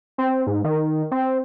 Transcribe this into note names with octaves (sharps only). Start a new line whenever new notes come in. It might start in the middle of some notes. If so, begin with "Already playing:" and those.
C4
G#2
D#3
C4